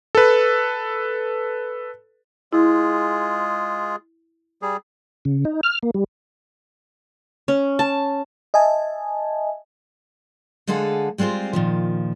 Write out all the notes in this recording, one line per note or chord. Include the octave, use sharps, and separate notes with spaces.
A4 B4
G#3 E4 F4 G#4
G3 G#4
C#3
D#4
F6
A#3
G3
C#4
A5
D#5 E5 G#5 A5
D3 G#3 G#4 A4 F5 F#5
G3 G#3 C4 F4 C5
A#2 D#3 F3